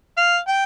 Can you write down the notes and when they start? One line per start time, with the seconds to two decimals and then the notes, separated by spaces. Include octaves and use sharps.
0.17 F5
0.47 G5